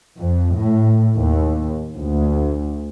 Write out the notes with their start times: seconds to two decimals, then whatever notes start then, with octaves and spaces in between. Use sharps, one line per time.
0.18 F2
0.56 A2
1.17 D#2
1.96 D2